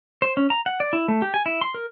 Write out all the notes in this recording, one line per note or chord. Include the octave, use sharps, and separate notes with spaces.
C5
C#4
A#5
F#5
D5
E4
A3
G4
G#5
E4
C6
A#4